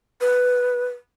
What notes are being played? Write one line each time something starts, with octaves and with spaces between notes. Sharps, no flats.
B4